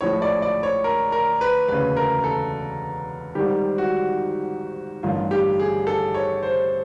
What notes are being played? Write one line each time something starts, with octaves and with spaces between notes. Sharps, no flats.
A#1 A2 F3 G#3 C#5
D5
D5
C#5
A#4
A#4
B4
E1 D2 C#3 B4
A#4
A4
G#1 G#2 D#3 G3 G4
F#4
A1 G2 D#3 F4
G4
G#4
A4
C#5
C5